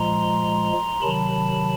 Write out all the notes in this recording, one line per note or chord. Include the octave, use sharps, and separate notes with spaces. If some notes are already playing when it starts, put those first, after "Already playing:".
Already playing: A#2 F3 G#3 A#5 C6
C3 D#3 F#3 A5 B5